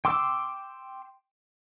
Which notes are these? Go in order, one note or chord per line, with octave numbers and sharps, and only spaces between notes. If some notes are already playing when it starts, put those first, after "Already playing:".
G5 C6 D6 E6